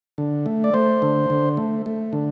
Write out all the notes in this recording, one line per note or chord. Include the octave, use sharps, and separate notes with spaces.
D3
A3
D5
A3 C5
D3
D3
A3
A3
D3